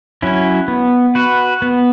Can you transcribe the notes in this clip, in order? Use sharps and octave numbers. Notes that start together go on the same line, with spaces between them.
F#3 C#4 E4
B3
F#4 B4
B3